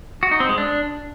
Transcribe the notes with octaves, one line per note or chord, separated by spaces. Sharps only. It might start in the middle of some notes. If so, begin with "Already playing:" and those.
F#4
D#4
C4
G#3
D4